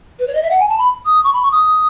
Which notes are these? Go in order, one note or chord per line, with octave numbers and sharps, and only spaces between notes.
B4
C#5
D#5
E5
F#5
G#5
A5
B5
D#6
C#6
B5
C#6
D#6